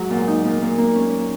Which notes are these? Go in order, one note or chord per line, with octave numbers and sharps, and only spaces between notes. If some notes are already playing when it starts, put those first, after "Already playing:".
Already playing: G#2 F#3
A#2
D#4
A#2
A#2
A#3
C#4